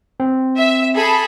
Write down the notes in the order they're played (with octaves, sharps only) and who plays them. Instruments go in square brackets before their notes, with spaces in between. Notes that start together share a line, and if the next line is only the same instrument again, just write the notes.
[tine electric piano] C4
[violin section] E5
G#4 A4 B5